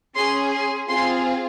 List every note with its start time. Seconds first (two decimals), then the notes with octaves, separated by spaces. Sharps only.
0.16 C#4 G#4 C6
0.52 C6
0.88 C4 F4 G#4 C6